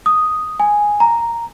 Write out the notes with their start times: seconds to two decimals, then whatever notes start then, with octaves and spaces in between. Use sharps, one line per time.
0.06 D#6
0.60 G#5
1.00 A#5